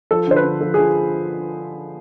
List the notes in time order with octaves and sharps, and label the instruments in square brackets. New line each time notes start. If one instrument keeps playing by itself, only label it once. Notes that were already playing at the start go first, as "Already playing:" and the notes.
[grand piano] F3 [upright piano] A4
[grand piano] D3 [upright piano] C5
[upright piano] B4
[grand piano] D3
[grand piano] F3 [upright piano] A4
[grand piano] F3 [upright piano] G#4